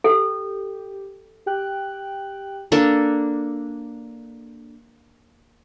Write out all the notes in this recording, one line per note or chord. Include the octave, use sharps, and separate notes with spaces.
G4 A4
G4 G5 F#6
A#3 D4 A4